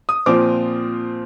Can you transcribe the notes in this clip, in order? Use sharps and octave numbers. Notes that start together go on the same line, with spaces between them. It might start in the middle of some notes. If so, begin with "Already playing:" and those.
D#6
A#2 F3 C4 D6